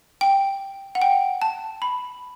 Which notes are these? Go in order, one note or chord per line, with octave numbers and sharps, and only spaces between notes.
G5
F#5
G5
A5
B5